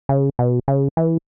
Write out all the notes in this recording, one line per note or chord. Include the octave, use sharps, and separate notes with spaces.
C#3
B2
C#3
E3